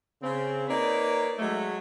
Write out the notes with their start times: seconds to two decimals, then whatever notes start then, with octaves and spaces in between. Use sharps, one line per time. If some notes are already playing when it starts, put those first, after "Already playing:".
0.22 C#3 C4
0.68 A#3 D#4 B4 C#5 D5
1.38 F#3 G#3 A3